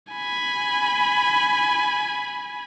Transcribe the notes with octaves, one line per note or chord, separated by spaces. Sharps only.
G#5 B5